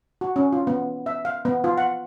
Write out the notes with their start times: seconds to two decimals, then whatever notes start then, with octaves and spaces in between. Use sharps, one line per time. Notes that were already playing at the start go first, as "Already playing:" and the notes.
0.21 F#4
0.36 C#4
0.53 F4
0.67 B3
1.06 E5
1.25 F5
1.45 B3
1.64 F4
1.78 F#5